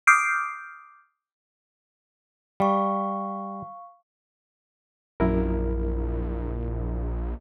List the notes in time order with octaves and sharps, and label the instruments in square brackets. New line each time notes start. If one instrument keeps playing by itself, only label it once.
[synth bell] D6 D#6 F6 G6 C7 D7
[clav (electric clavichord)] G3 [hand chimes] F5 C#6
[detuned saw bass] A#1 [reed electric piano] F#2 E4 A#4